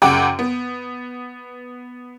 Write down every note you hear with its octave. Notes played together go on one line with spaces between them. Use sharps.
F#2 C#3 F#5 G5 D6 D7
B3